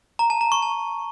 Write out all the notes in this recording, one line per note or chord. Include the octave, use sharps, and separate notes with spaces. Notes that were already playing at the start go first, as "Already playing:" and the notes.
A#5
A5
A#5
C#6
A5